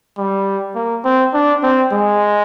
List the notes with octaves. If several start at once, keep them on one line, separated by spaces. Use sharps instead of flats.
G3
A#3
C4
D4
C4
G#3